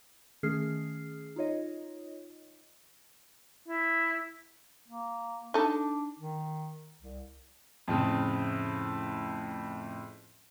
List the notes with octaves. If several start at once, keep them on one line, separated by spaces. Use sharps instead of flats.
D#3 A3 C#4 G#4 F6 C7
D#4 F4 C#5 D#5
E4
A#3
D4 D#4 A4
D#3
C2
F2 A2 C#3